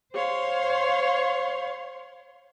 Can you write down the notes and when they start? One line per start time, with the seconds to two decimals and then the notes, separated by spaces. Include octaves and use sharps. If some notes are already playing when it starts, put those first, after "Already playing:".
0.12 C5 C#5 F5 C6